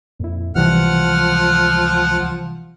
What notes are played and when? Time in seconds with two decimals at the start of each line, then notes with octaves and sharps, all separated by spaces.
0.20 F2 A#2 E4
0.55 C#2 C3 E3 F3 G3 F#5 F6